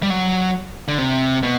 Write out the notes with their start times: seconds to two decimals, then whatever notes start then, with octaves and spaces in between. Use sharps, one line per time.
0.03 G3
0.10 F#3
0.88 D3
0.98 C3
1.43 B2